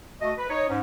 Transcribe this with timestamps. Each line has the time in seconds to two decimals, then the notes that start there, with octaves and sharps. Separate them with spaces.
0.21 A3 F#4 D#5
0.38 B4
0.50 D#4 C#5
0.69 G#2 C#4